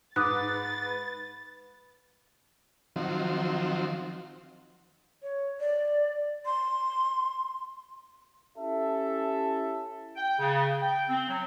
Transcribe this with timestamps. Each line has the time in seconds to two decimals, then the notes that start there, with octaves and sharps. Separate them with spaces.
0.16 G#2 B4 D6 D#6 F#6 A6
2.96 D#3 F3 F#3 C4
5.23 C#5
5.60 D5
6.46 C6
8.57 C#4 E4 G4 A4 E5
10.16 G5
10.39 C#3
10.81 G5
11.09 C4
11.28 F#3